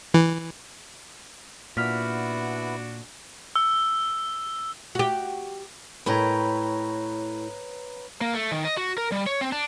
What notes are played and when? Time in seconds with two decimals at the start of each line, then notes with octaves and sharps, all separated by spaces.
0.14 E3
1.77 A#2 B3 D4 E4 F#4 F6 B6
3.56 E6
4.95 F#4 G4
6.06 A2 E4 B4 C#5 G5 A#5
8.21 A#3
8.34 A3
8.52 D#3
8.65 D#5
8.77 F#4
8.98 A#4
9.12 G3
9.26 C#5
9.41 C4
9.52 D4